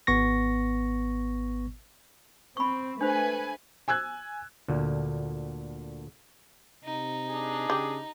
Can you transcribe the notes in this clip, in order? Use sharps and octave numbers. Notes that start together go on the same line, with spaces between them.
G#1 B3 C#6 A#6
C4 B5 C#6
A3 D4 B4 C5 G#5
G#5 E6 F#6 G#6
D2 A#2 D3
C3 D#4
D4 G#4
C#3 G4